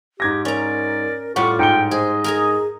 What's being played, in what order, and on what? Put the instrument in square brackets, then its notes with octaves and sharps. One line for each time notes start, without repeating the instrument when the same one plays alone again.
[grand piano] G#2 G#6 A#6 [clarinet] G4
[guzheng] C#4 A#5 [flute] A#4 [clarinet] D5
[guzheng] A2 G3 D5 [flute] F4 [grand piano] F#5 [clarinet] C#6
[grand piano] G#2 C#7 G7 [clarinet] G5
[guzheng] G#4 [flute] C5 [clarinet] D#5
[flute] G#4 [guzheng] A#4 G#5 A#5